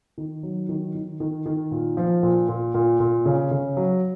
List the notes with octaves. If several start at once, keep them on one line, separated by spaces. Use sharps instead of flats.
D#3
F#3
D#3
D#3
D#3
D#3
A#2
F3
A#2
A#2
A#2
A#2
C#3
C#3
F#3